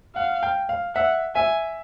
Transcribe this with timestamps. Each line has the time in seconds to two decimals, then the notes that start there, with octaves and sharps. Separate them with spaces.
0.16 F5 F#5
0.43 G5
0.69 F5
0.95 E5 F#5
1.35 E5 G#5